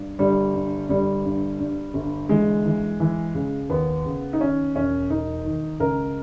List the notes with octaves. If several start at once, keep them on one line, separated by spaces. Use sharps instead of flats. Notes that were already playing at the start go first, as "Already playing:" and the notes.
Already playing: G2
G1 G3
G2
G1 G3
G2
G2
G1
E3 G#3
E3
E3
C#3
D#2 B3
C#3
D#4
D#3 C#4
E1 C#4
E1 D#4
D#3
C#2 A#4